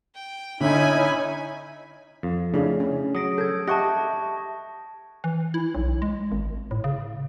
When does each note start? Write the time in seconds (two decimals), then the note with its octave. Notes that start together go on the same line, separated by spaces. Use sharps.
0.15 G5
0.61 D3 C#4 D#4 E4 G#5 B5
2.23 F2 F5
2.54 C#3 A3 D4 E4 G#4
2.80 C#4
3.15 F#3 D#6 A#6 D7
3.38 A4 G6 G#6
3.68 G4 D#5 E5 F#5 A5 C#6 A#6
5.24 E3
5.54 E4
5.75 B1
6.02 G#3
6.32 G#1
6.71 A2
6.84 C#3